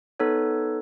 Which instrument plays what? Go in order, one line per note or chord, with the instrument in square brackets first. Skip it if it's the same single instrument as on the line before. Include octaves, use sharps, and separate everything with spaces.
[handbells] B3 D#4 A4 B4 C#5